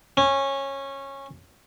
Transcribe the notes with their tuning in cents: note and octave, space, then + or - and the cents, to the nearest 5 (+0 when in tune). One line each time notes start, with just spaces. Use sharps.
C#4 -15